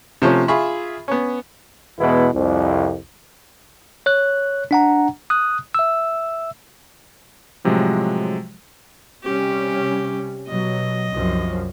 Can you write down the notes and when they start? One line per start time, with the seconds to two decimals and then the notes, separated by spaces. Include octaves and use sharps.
0.22 C3 F3 A3 C#4
0.48 F4 G#4 E5 B5 C#6
1.08 B3 C#4
1.99 E2 B2 G#3 B3 E4
2.34 C2 F2
4.06 C#5 F#6
4.71 D4 F#5 A#5
5.30 D#6 F#6
5.75 E5 E6
7.64 A2 C3 F3 F#3 G#3
9.23 C3 G3 C#4 G4
10.48 B2 F#3 D#5
11.12 C2 F#2 F3